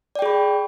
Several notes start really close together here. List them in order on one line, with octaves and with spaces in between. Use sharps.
D5 G5 G#4 B5